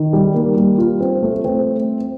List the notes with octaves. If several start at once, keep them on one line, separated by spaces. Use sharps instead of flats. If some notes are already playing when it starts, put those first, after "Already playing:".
Already playing: D#3
G3
A#3
G3
F4
C4
A3
C4